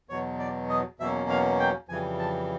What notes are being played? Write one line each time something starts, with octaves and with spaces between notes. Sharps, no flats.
E2 B2 F#3 C#5
D5
D#5
E2 B2 F#3 A#3 C#4 E5
F5
G5
F2 C#3 E3 G3 G#5
A5